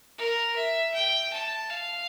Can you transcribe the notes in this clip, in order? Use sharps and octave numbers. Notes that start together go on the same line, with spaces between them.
A#4
E5
G5
A5
F5